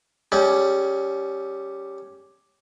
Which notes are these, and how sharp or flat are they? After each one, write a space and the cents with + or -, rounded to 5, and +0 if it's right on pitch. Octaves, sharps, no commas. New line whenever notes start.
G3 +0 C#4 +0 G#4 +35